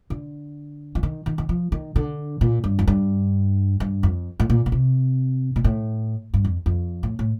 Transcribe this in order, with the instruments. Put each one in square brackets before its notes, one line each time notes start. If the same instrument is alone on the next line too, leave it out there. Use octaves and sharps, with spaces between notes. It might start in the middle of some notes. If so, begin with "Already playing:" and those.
[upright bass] D3
F3
D#3
D#3
D#3
F3
D#3
D3
A#2
G2
F2
G2
G2
F2
A2
A#2
A#2
C3
A#2
A2
G2
F2
F2
A2
A2